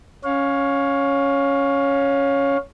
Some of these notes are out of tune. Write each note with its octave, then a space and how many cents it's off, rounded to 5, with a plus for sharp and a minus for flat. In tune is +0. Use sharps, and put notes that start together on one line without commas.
C#4 +0 C#5 +0 F5 +20